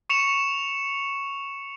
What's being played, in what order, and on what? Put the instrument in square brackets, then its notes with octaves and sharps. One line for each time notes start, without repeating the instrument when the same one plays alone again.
[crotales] C#6 C#7 E7 F7